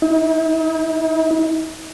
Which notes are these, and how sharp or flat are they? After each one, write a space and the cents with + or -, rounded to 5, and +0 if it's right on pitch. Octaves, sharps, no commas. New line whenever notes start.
D#4 +45